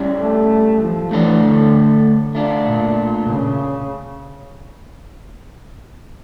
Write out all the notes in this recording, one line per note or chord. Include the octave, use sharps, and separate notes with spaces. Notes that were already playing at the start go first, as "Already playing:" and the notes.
Already playing: G3 C#4 E4 G4 D5
A3
F3
E3 A3 D4 A4 C#5
D3
A3 D4 F4
A#2
C#3